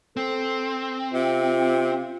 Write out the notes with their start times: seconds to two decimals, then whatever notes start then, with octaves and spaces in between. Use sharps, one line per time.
0.17 C4 A4
1.13 C3 F4